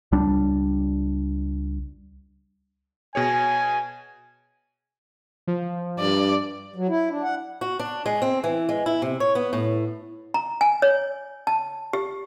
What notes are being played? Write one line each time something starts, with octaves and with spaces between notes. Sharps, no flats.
C#2 G3 D4
B2 G#4 C#5 G#5
F3
G2 D5
F#3
E4
D4
F#5
F#4
D4
G#3
C4
E3
G#3
E4
C3
C#5
B3
A2
A#5
G#5
C#5
A5
G4